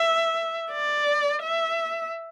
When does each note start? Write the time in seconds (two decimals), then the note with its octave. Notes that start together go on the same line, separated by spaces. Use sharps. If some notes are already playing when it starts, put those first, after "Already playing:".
Already playing: E5
0.72 D5
1.42 E5